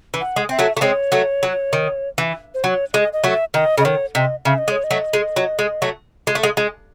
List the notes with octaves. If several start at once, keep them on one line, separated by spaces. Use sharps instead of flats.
E3
F#5
G#3
C4 E5
F#3 A3
A3
G#3 C4 C#5
F#3 A3
F#3
D#3
E3
C5
F#3 C#5
G#3 D#5
D#5
F#3 A3 E5
D#3 D#5
C#3
D#5
D#3 C#5
C3 D#5
C#3 E5
D#5
G#3
C#5
D#5
F#3 A3
G#3
F#3
G#3
F#3 A3
G#3
A3
G#3
G#3